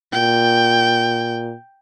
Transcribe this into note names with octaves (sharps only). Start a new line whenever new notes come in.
A#2 G5